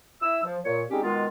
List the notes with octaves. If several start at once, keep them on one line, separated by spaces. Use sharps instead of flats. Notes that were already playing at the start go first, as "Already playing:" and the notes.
E4 E6
F3
A#2 C#5
G3 G#3 C4 C#4 D#4 G4
B2 D#3 G#3 B3 F4